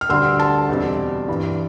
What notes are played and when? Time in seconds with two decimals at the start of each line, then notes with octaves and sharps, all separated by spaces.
0.01 F6
0.09 D2 D3 G3 C6 E6
0.39 A5 C6
0.69 E2 B2 G3 C4
1.28 G2 E3 G3